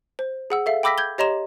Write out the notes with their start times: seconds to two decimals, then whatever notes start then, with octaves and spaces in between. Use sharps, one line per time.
0.19 C5
0.50 G#4 F#5 E6
0.66 A4 E5 F5
0.83 G5 B5 D6 E6 A#6 B6
0.98 G6 G#6 G7
1.18 G4 C#5 D#5 A#5 C6 E7